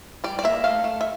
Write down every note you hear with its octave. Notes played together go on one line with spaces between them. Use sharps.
G3 D5
D5
A#3 E5
A3 F5
A3
E5